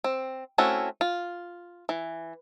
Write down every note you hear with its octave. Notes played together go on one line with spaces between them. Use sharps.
C4
A3 C4 C#4 E4 F#4
F4
E3